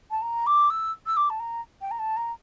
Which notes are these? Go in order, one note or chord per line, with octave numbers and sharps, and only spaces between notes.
A5
A#5
D6
E6
E6
D6
A5
A#5
G5
A#5
A5
A#5